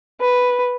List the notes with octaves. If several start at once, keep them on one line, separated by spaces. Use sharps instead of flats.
B4